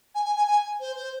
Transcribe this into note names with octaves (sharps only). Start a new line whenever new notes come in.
G#5
G#5
G#5
G#5
C5
C5